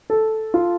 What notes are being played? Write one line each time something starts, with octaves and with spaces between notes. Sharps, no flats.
A4
F4